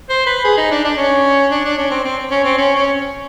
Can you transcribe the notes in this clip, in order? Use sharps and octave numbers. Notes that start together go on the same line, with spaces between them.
C5
B4
G#4
D#4
D4
D4
C#4
D4
D4
C#4
C4
C4
C#4
C4
C#4
C#4